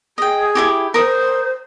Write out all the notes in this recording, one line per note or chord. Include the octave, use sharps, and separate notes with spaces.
G#4 D#5 G5
E4 F#4 G4
A#4 C5 D#6